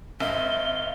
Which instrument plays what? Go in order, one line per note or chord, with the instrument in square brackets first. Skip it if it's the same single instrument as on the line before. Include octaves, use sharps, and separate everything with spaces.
[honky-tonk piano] G#1 [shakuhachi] E5 [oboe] F5 [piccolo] G7